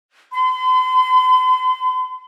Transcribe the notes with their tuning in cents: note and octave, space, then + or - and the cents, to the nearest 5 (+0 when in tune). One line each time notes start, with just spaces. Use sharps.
C6 -45